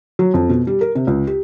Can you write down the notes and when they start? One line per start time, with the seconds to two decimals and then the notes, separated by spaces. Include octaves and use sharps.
0.19 F#3
0.34 F2
0.49 B2
0.67 G3
0.81 A#4
0.95 C3
1.07 C#2
1.27 G4